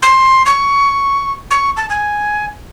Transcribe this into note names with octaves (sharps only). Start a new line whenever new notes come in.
C6
C#6
C#6
A5
G#5